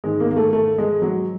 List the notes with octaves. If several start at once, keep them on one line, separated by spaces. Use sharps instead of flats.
G#2 D#3 G#3
A#3
A#3
A3
A3
G#3
F#3